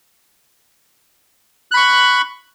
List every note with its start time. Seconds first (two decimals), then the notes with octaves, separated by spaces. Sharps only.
1.71 F#6
1.74 B5
1.77 C#6